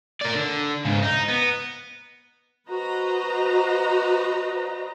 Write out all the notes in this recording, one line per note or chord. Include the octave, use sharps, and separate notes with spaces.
A#4 D5
D3
G#2 C#3
D#4
B3
F#4 B4 C5 D#5 A#5